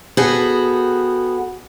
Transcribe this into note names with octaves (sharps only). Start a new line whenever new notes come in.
B3 F#4 G#4 A4 G5